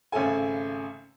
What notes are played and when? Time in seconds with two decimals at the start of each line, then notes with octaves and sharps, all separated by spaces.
0.12 G#1 C#3 A3 A4 G#5